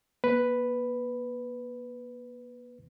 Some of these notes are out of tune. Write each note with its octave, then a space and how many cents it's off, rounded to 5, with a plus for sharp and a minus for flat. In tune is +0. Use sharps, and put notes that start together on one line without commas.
A#3 +45 B4 +0